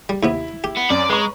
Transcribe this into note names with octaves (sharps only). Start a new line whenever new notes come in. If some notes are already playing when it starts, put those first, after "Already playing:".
G3
D#2 C3 B3 E4
G4
B3
F#2 D5
G#3 B4 A#5 C#6